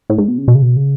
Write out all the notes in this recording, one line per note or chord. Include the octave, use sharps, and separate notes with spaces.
A2
G#2
B2
C#3
B2
C#3
B2
C#3